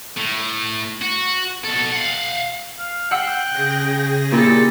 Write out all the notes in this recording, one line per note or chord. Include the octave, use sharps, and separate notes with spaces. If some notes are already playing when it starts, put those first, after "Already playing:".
A2
F#4
B2 A4
F5 F#5
F5
F#5 G5 E6 F#6 C7
C#3 G#4 A#6
A#2 E4 G4 A4